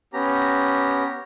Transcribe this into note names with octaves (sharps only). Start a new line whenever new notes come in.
B3 C#4 G4 A#5